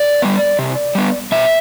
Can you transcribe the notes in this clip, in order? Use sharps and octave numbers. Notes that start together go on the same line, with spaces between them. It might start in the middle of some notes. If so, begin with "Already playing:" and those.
Already playing: D5
G3 B3
C3
G3 B3
B2 E5